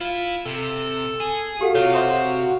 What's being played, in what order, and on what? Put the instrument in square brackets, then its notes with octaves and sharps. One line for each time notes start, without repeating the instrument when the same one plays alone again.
[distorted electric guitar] E4 [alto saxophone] F4
[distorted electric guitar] C3 [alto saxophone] A4
[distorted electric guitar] G#4 [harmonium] G#5
[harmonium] F#4 F5 [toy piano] G4 A4 F#5
[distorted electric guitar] C3 [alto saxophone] F4 [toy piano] C#5
[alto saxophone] C5 [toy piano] E5 C6 D#6